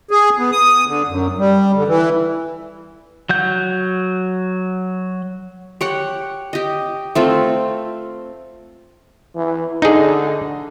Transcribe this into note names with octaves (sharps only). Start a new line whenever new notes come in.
G#4
B3
D#6
D3
F#2
G3
D3
E3
F#3 F#5 G6
G4 C#5 F#5
G4 D#5
A3 C4 F4
E3
D3 D#4 G#4